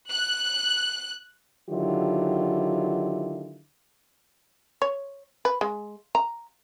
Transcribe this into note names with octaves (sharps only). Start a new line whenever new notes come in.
F#6
D3 D#3 F#3 E4 F4 G4
C#5
B4
G#3
A#5